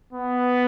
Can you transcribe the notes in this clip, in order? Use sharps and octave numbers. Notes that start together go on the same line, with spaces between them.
B3